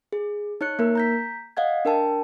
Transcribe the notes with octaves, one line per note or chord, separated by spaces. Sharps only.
G#4
D#4 C#5 F#6 C#7
A#3 A#4
A#5 G6 B6
D#5 F5 F#5 G#6
D4 A#4 G5 A5